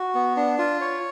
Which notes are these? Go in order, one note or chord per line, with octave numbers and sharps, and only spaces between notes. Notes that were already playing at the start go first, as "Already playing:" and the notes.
Already playing: F#4
B3
D4
F4
C#5